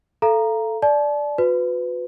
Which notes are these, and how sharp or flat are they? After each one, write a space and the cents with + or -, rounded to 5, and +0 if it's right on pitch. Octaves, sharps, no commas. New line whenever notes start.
A4 +0 F5 -35 A#5 +0
D5 +0 A5 -35
F#4 -40 B4 +20